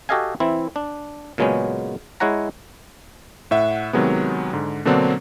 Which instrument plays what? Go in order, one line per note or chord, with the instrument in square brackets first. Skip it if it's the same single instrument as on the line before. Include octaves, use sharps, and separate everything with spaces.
[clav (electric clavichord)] F#4 G4 A4 D#5 F5 G#5
E3 C4 E4
D4
A#2 C#3 F#3 G#3 B3 C#4
G#3 E4 C#5 F#5 A#5
[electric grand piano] A2 E5 F#5
C3 D#3 F#3 G#3 B3
G#2 D3
B2 D3 F#3 A#3 C4 D4